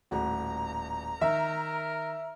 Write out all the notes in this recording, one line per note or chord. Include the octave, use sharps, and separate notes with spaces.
D#1 A2 F#4 A#5
D#3 A#4 E5